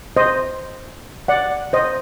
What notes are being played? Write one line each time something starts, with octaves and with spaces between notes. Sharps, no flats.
C5 D#5
D5 F#5
C5 D#5